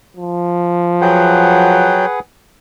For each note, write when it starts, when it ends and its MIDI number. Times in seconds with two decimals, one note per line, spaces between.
0.16 2.03 53
1.01 2.06 54
1.01 2.20 68
1.01 2.20 71
1.01 2.20 78
1.01 2.06 79